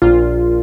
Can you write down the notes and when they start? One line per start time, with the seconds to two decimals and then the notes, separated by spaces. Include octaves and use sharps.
0.02 A#1 A#2 F4